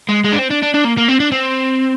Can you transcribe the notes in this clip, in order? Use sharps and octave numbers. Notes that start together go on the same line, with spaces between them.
G#3
G#3
D4
C4
D4
D4
D4
A#3
A#3
C4
D4
C4